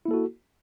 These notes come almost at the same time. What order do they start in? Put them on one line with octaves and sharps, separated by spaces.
E4 A#3 A4 F#4